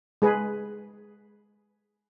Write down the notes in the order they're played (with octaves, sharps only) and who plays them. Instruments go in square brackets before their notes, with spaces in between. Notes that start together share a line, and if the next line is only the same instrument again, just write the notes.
[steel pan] G#3 G#4 B4